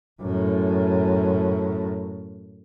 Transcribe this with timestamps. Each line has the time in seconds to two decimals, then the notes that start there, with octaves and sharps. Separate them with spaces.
0.22 F#2 A2